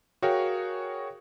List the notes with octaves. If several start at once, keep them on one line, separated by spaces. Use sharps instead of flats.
F#4 G#4 A#4 C#5 F5 G5